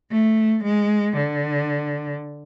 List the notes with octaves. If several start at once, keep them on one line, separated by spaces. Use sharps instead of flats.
A3
G#3
D3